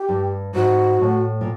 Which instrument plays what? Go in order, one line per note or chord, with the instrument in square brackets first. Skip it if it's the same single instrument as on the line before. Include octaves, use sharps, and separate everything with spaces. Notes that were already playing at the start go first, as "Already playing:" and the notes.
Already playing: [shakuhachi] G4
[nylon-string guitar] G2
[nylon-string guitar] G#2 [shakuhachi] F#4
[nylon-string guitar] A2
A#2